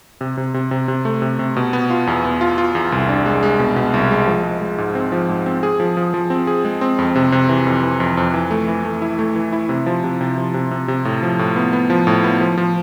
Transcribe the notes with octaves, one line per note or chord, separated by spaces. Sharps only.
C3
C3
C3
C3
C3
A3
C3
C3
B2
B3
F4
E2
B3
F4
F4
E2
C2
D4
G#3
G#3
B2
B2
C2
G#3
F3
G#3
G#3
G#2
C4
F3
G#2
C4
G#4
F3
F3
F3
C4
G#4
G#3
C4
F2
C3
C3
E3
F2
E3
F2
F2
E3
A3
E3
A3
E4
A3
E3
E4
C3
F3
C3
C3
F3
C3
C3
C3
A2
F3
A2
B3
B3
F3
A2
B3
F3
F3